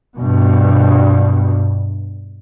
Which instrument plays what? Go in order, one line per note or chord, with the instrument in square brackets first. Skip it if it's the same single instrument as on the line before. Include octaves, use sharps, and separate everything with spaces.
[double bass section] G2 B2